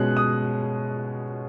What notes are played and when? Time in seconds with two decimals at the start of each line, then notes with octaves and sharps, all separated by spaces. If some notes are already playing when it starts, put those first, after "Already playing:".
Already playing: B2 G#3 C#4 F#6
0.17 D#6